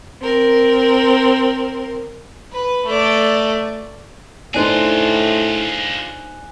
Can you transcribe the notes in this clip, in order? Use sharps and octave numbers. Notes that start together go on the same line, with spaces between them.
C4 A#4
B4
A3 D5
A2 D4 D#4 F4 G#4 C5 G#5 F#6